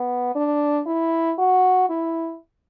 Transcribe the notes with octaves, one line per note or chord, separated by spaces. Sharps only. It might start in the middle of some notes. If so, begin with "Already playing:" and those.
Already playing: B3
D4
E4
F#4
E4